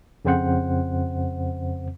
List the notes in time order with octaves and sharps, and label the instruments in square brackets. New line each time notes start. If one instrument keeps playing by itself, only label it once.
[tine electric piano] F2 C#3 C4 C5 F#5